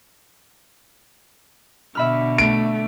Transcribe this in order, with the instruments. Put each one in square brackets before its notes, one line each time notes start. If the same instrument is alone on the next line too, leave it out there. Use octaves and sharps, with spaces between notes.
[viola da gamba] B2 D3 [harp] E5 B5 F6
[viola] A3 [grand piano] D7